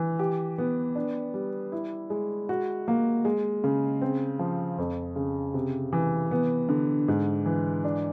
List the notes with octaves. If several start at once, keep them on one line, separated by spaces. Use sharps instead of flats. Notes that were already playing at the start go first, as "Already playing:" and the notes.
Already playing: E3
G4
B3
D4
G3
E4
G#3
F#4
A#3
G#3
C#3
C4
F3
F2
C#3
C3
E3
B3
D3
G#2
E3
D4